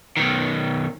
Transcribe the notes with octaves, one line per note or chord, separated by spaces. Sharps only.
B1 D#3